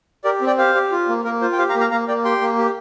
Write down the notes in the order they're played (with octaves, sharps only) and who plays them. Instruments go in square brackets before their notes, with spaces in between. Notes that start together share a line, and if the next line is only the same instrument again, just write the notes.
[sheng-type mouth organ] G4 A#4 D5
C4
D5 G5
G4 C5 F5
G4
F4
A#3
A#3 A#4
F4 C5
G5
G4 C5 F5
F5 A#5
A#3
F5 A#5
A#3 F5 A#5
A#3 D5 G5
G4 G5 C6
A#3
G4